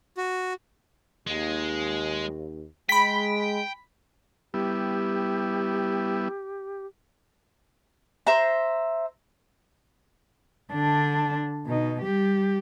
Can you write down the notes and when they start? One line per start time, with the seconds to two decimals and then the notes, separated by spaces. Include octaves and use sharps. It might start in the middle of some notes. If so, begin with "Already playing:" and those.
0.17 F#4
1.27 D#2 G#3
2.89 G#3 G5 B5 B6
4.54 G3 B3 E4 G4
8.27 C5 E5 A#5
10.73 D3 D4
11.66 B2 D#4
12.02 G3 G4